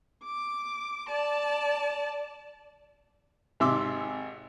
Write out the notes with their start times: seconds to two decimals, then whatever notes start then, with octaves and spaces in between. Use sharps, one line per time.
0.24 D6
1.09 D5 A5
3.60 G#1 C3 E5 C6 D6 E6